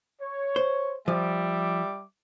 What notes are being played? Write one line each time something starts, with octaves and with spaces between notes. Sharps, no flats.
C#5
C5
F3 G3 E5 D6